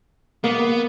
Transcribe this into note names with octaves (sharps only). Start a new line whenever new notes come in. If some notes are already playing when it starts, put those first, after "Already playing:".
A#3 B3